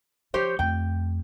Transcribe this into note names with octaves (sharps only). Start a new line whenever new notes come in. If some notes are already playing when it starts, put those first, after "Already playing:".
F3 G4 C5 C#5
F2 A3 G5